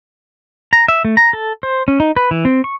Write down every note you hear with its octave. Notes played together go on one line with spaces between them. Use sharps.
A#5
E5
A3
A#5
A4
C5
C#4
D#4
B4
E3
C4
C#6